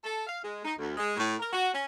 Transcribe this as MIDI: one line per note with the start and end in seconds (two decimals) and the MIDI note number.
0.04 0.25 69
0.27 0.40 77
0.43 0.63 56
0.65 0.74 63
0.78 0.94 38
0.97 1.14 56
1.17 1.34 45
1.39 1.52 70
1.53 1.68 66
1.74 1.85 61